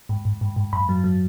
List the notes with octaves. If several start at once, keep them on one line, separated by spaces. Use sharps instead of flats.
G#2
G#2
G#2
G#2
F#2 B5
F#3
F#3